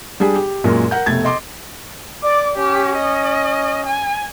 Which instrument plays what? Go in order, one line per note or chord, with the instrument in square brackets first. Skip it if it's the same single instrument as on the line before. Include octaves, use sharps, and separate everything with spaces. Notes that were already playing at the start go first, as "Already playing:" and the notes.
[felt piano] G3 D4 G4 G#4
G4
F#2 A#2 G#3 A#4
A#4 F#5 G6
F1 B2 A3 G#6 A6
D#5 C6 D6
[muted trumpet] D5 [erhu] D6
[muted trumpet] C#4 [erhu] G4
[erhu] D#5
G#5